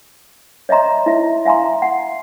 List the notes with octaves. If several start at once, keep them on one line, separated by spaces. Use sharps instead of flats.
C#5 D#5 E5 A#5 C6
E4 E5
E5 F5 G#5 A#5 C6
F#5